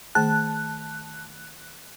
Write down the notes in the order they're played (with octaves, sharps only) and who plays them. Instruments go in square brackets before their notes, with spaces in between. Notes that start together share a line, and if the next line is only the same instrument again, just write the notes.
[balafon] D#3 A3 G#4 [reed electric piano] A5 [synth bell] F#6